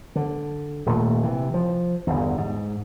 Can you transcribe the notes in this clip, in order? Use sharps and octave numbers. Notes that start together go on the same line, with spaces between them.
D3
D#1 A#2 A3
C3 E3
F3
G1 E2
G#2